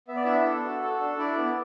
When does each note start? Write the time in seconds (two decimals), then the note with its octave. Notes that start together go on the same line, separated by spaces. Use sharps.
0.08 B3 E5
0.16 D5
0.24 D4 E4 E5
0.45 A4
0.64 F#4
0.81 A4
1.00 D4
1.18 D4 E4 D5
1.37 B3